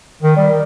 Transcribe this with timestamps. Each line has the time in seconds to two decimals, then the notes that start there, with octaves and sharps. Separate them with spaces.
0.23 D#3
0.37 G3